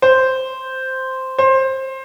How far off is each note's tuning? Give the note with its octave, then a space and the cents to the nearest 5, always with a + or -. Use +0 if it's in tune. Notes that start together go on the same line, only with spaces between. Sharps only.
C5 -5
C5 +20